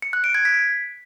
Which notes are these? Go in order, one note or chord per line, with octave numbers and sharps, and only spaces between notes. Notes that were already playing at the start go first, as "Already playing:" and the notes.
C#7
F#6
D7
G#6
B6